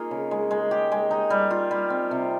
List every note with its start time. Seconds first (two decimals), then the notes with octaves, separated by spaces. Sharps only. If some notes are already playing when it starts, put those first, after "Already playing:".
Already playing: A#3 D#4 F4 G#4
0.11 C#3
0.31 G#3
0.51 G#3
0.71 G4
0.92 G#3
1.11 D#4
1.30 G3
1.50 F4
1.71 G3
1.90 C4
2.11 C3